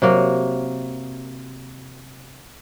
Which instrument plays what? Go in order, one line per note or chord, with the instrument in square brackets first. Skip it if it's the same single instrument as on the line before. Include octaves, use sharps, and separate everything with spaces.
[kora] C3 F#3 A#3